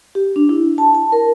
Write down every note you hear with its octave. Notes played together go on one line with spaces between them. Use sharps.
G4
D4
E4
A5
A5
A#4